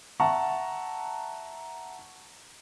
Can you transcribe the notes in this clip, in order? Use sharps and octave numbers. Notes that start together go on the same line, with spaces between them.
E5 F#5 A5 A#5 C#6